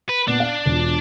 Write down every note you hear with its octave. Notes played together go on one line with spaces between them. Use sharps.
B4
A#2 B3 D4
F5
E1 F4